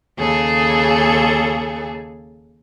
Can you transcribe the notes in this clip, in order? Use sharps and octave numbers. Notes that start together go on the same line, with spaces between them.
D#2 C#3 G#4 A4